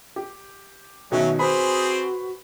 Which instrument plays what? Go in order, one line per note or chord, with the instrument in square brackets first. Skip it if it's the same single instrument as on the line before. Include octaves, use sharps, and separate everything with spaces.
[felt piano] G4
[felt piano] B2 D#3 [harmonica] F#3 C#4 [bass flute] E5
[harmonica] C4 G#4 [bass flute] F#4 [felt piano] B4 C5 B5